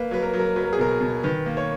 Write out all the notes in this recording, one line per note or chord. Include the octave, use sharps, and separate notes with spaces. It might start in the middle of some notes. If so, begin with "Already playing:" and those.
Already playing: A#3 B4
F#3 B4
A#4
F#3
A#4
F#3 B4
A#4
G#4
B2 A#4
B2
D#3 B4
A#3
C#5